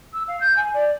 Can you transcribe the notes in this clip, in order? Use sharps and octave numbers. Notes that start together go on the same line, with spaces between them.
E6
F5
G6
G#5
D5